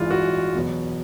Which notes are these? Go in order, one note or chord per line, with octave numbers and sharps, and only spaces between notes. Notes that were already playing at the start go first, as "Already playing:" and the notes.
Already playing: A1 G2 E3 G#3 F4
F#4
E2 B2 F#3 B3